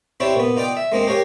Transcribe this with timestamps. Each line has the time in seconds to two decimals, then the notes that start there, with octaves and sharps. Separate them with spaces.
0.20 C4 E4 G4 C#5 D5
0.36 A#2 B3
0.57 D#4 F4 D5 G5
0.77 E5
0.92 G#3 A#3 C4 D#4
1.07 G4 A#4 C#5 F5 G#5